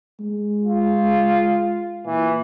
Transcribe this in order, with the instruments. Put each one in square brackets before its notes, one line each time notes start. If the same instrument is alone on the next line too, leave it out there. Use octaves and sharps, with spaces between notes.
[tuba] G#3
[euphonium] F4
[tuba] A#2 [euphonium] E3